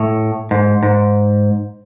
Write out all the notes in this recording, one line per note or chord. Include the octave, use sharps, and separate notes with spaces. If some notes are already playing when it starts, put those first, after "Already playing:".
Already playing: A2
G#2
G#2